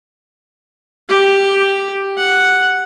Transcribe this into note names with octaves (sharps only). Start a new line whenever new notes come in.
G4
F#5